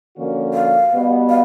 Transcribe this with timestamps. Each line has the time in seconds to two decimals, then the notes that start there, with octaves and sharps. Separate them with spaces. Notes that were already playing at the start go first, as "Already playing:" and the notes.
0.15 D3 F3 A#3 C#4 F#4
0.54 F5
0.91 B2 G3 B3
1.29 F5